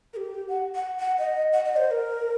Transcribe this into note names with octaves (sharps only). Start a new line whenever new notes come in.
A#4
G4
F#5
F#5
F#5
D#5
F#5
D#5
C5
C5
A#4